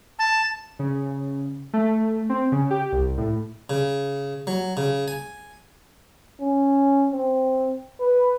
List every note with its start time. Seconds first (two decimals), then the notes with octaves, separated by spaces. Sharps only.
0.19 A5
0.79 C#3
1.73 A3
2.29 C4
2.52 C#3
2.70 G4
2.92 C2
3.18 A2
3.70 C#3
4.47 F#3
4.77 C#3
5.08 G#5
6.41 C#4
7.12 C4
8.00 B4